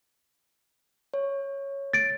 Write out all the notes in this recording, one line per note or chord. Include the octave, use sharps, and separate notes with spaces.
C#5
A6 D7